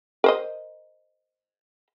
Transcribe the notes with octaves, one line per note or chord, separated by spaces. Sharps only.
A#4 C5 D#5